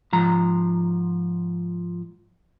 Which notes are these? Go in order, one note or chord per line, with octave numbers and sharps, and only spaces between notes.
G#2 F3 A#5